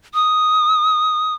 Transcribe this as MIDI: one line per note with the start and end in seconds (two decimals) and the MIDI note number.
0.14 1.34 87